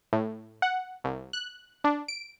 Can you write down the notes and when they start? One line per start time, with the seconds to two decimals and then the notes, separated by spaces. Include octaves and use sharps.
0.13 A2
0.62 F#5
1.04 C2
1.33 F#6
1.84 D4
2.08 D7